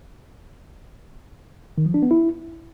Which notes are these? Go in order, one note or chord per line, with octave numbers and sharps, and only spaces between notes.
D#3
F3
D4
B3
E4